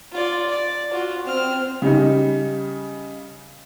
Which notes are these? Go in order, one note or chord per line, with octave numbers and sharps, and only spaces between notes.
F4 D5
D5
F4 F#4
C4 F6
C#3 G3 D#4